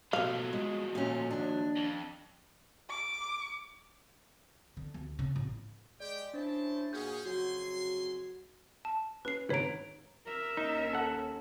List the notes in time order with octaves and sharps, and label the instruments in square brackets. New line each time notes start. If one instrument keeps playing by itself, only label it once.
[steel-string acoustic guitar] B2 A3 [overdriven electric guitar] F3 F#3 [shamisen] F5
[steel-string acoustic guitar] G#3
A#2 A3 C#4
D#2 D4
[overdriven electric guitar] F2
[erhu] D6
[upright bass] D3
D2
C#3
A1
[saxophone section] G#3 [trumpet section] G4 G5 [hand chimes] D5
[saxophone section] C#4 E4 C5 [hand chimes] D4 [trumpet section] A5
[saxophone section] A#2 F#4 G#4 [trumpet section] C#4 [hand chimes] G6
[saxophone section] F2 C#3 F#3 [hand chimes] F#4 [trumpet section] G#5 C6
[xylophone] A5
[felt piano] C#4 [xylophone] B4 C7
[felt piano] G#1 [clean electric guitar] B4 A#5 [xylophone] C#5 D7
[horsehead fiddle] A#4 E5
[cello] D#2 C#4 [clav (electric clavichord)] D#4
[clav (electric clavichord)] A4 F#5